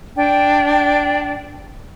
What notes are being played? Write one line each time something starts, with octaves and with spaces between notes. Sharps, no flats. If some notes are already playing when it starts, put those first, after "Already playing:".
D4 G5